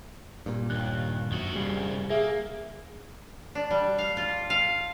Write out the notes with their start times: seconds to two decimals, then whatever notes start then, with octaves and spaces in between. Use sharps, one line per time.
0.46 G2 A#2
0.70 D#2 F#6
1.32 F#2 D#3 F#4
1.56 C2 C#3 G3
2.10 A#3 G#4 E5
3.55 D4
3.71 G3
3.98 F5
4.17 F4
4.50 F5